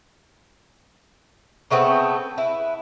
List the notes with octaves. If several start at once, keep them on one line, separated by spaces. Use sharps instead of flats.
C#3 A3 B3 C4
E4 B4